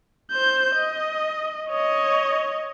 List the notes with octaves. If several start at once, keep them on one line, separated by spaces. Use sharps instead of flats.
C5 G6
D#5
C#5 D#5